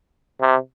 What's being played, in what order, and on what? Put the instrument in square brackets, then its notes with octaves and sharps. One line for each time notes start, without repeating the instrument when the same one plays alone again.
[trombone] C3